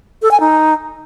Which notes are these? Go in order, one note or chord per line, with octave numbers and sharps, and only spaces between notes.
A4
G#5
D#4